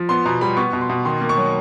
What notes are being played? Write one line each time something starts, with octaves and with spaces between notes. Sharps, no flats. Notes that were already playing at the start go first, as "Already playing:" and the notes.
Already playing: F3
B3 C6
B2 A#5
G3 B5
B3 C#6
B2
C6
B2
D#3 C6
A#3
C#6
F#3